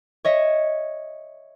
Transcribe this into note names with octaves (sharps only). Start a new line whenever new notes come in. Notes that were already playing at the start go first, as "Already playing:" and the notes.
C#5 D#5 E5